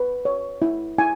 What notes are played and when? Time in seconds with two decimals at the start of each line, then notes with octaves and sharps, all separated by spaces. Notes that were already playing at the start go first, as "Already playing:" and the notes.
Already playing: B4
0.25 C#5
0.62 E4
0.98 E4 G#5